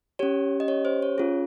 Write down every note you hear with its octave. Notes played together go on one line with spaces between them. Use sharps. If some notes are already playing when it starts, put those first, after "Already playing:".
C#4 G4 C#5
D#5
C#5
C5
C#5
C#4 F4 G#4